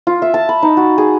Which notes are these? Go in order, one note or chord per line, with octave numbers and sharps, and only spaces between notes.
F4
E5
A5
B5
D#4
F#4
G#4